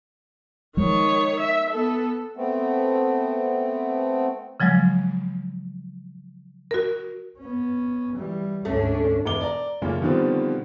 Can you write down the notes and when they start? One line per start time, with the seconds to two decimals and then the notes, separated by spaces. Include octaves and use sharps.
0.77 D#3 F3 G#3 C#5
1.40 E5
1.70 B3 A4
2.37 A3 B3 C4
4.60 C#3 F3 F#3 G#3
6.71 F#4 A#4
7.39 B3 C#4
8.15 E3 G3
8.65 D2 G#2 A3 C#4 D4
9.25 E1 D6 G7
9.41 D5 A#5
9.82 F#2 A#2 C#3 A3 A#3 C#4
10.02 B2 D3 D#3 F3 G3 C4